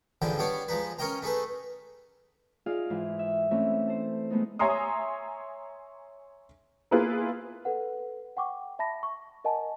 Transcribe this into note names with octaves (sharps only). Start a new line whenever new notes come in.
A1 G#2 D3 F3 E4 G5
G3 B3 D4 C#5 D5
F3 G#3 D#4 B4
C#4 A#4 C#5 D#5 G5 A#5
A3 D#4 G#4 A4 B4
D#4 F4 G#4 D5 F5
G#2 E3
E5
E3 A3 C4 C#4
A4 C5
G#3 A3 B3 D#4
C#5 E5 G#5 A#5 C6 D#6
A#3 B3 E4 F4 G#4 B4
A4 B4 F#5
F#5 G5 C#6 D6
E5 A5 B5 A#6
C#6
A#4 D#5 F#5 G#5 A5